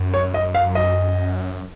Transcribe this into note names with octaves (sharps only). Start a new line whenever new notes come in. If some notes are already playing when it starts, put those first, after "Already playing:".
Already playing: F#2
C#5
D#5
F5
D#5